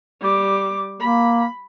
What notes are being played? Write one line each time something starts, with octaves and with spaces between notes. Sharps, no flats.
G3 D6
A#3 B5